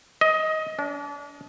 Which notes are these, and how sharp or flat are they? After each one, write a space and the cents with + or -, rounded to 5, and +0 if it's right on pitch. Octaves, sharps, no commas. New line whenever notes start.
D#5 +15
D4 -35